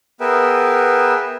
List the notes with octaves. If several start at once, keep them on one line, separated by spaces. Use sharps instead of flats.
B3 G#4 A#4 B4 E5 G5